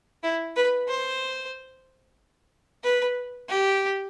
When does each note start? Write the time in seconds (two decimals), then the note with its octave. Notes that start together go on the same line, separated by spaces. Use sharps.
0.23 E4
0.56 B4
0.89 C5
2.84 B4
3.49 G4